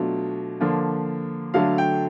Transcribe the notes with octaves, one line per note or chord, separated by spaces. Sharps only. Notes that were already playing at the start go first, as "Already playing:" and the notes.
Already playing: B2 F#3 A3 D4 F4
D3 F3 A#3 D4 F4
D3 F#3 A3 D4 F5
G5